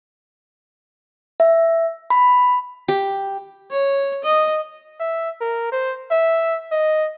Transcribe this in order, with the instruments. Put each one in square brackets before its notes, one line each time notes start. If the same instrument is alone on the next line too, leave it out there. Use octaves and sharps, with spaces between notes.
[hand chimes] E5
B5
[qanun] G4
[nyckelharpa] C#5
D#5
[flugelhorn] E5
A#4
C5
E5
D#5